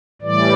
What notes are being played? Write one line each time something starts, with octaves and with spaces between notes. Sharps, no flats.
A2 E3 G3 D5